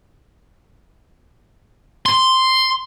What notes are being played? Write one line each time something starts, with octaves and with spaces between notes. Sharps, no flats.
C6